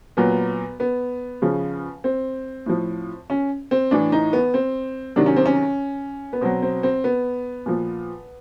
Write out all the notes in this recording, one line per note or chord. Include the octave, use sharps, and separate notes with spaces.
A#2 F#3 B3
B3
C#3 F3
C4
A2 F3
C#4
C4
A2 E3 D4
D#4
B3
C4
C3 D#3 F#3 D4
C#4
C4
C#4
B3
B2 F#3 C4
C4
C4
B3
A#2 F3